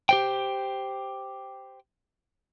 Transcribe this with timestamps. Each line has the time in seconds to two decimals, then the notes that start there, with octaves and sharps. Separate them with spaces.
0.09 G4 C5 G5